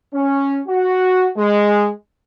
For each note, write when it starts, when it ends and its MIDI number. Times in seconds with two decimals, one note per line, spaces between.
0.14 0.60 61
0.67 1.28 66
1.37 1.90 56